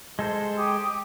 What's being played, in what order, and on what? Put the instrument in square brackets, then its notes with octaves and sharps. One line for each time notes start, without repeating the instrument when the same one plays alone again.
[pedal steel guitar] G#3 A4 C5
[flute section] G4 D#6